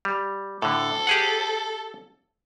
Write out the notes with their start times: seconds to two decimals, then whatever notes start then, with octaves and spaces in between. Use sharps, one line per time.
0.05 G3
0.62 A2 D3 A4
1.07 G4 G#4 F#5